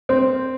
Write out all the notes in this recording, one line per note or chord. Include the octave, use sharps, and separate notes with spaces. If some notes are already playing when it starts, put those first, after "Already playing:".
C4